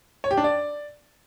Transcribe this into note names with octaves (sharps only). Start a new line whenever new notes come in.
C#5
G4
D4
D5